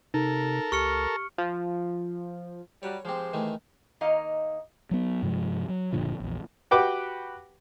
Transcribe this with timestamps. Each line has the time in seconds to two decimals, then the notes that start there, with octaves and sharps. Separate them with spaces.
0.14 C3 D#4 A4 A#4
0.72 C#2 G4 C#6 F6 C#7
1.38 F3
2.83 F#3 G3 C#5
3.05 F3 G#3 C4 G4 C5
3.33 D#3 E3 A3
4.01 D#3 A#3 D#4 D#5 F5
4.91 F#3 B3
5.23 G2 C3 F3 G#3
5.69 F#3
5.93 F#1 A#2 D3 F3
6.20 A#1 E2
6.71 F#4 G4 B4 G5 D6